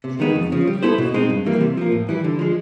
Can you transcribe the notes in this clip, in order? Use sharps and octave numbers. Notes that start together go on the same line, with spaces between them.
C3
D#3 G#3 B3 D#4
F2
C#3 F3
G3
B3 E4 A4 C5
B2
G#3 C4 D#4
G2
E3 G3 A#3
C3
F3 A#3
A2
E3 G3
D3
F3 G#3